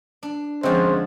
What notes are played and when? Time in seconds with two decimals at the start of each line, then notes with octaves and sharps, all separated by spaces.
0.23 D4
0.63 F2 D3 G#3 C4 C#4 C5